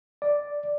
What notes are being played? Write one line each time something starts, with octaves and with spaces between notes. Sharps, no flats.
D5